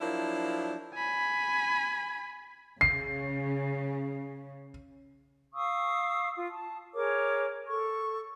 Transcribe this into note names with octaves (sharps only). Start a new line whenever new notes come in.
F3 F#3 A#3 D4 E4
G#5 B5
C#3 C7
F5 C#6 D#6 E6
F4
A5
G#4 A#4 C#5 D6
A4 C#6